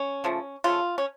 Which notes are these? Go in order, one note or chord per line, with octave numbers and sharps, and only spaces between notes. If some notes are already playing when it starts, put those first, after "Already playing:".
Already playing: C#4
C#3 F3 A3
C#3 F3 A3 F4
C#4